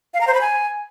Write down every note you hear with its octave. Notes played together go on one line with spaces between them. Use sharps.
F5
A#5
C5
B5
G#5